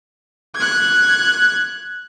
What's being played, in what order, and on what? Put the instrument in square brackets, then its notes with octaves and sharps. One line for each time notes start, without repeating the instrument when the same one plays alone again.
[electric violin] F#6 G#6